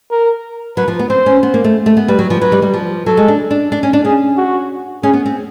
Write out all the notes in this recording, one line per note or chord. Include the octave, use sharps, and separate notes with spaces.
A#4
F#3 B4
F3
B3
C4 C5
C#4
B3
A#3
A3
A3
B3
G3 B4
F#3
F3
F#3 B4
G3
G3
F3
F#3 A4
G#3
D4
D4
D4
C#4
D4
C#4 G#4
F#4
C#4 G#4
B3
C4